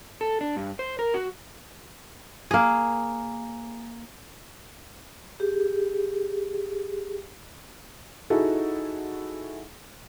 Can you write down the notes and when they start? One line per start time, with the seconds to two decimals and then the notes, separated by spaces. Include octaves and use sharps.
0.21 A4
0.41 D4
0.56 G2
0.79 C5
0.99 A#4
1.14 F#4
2.51 A#3 G#4
5.40 G4 G#4
8.30 D#4 E4 F#4 G#4 A4